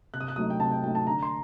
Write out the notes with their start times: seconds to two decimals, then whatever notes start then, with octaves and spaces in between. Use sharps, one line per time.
0.14 C3 F#6
0.21 D#6
0.28 F#6
0.36 F#3 A3 D#4 D#6
0.50 G5
0.60 C3 A5
0.72 G5
0.83 F#3 A3 D#4 G5
0.95 A5
1.07 D3 A#5
1.23 C6